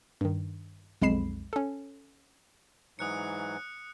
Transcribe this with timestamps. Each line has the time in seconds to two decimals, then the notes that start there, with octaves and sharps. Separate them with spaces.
0.21 G2 D#3
1.02 B1 F2 G#3 B5 C7 E7
1.53 C#4 A4
2.99 G#2 E3 F#3 D#6 F#6 C#7